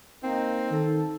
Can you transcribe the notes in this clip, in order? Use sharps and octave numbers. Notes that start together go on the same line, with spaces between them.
A#3 C4 D#4
D#3 A4